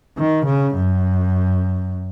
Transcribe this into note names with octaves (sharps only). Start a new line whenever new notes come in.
D#3
C#3
F#2